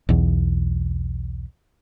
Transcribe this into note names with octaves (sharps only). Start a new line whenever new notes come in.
B1 E2